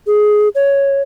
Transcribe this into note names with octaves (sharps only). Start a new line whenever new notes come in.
G#4
C#5